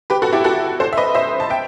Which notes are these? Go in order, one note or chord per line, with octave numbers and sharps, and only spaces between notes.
G4 B4
F#4 A4
E4 G4
F#4 A4
A4 C5
E5
B4 D#5
C5 E5
A5
E5 G5